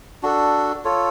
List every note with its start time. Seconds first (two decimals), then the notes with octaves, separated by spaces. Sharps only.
0.23 D4 F#4 A4
0.85 F4 A4 C#5